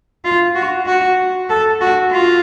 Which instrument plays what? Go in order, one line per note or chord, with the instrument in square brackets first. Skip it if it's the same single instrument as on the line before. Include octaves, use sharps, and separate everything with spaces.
[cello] F4
F#4
F#4
A4
F#4
F4